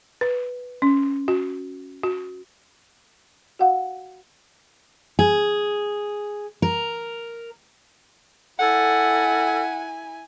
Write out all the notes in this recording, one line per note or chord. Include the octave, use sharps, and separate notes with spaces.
B4
C#4
F#4
F#4
F#4 F5 F#5
G#4
A#4
E4 A4 F#5 G#5